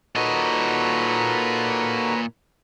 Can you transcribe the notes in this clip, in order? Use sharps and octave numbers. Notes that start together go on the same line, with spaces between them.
A#2 D#4 F#4 A4 B4 C#5 D#5 A#5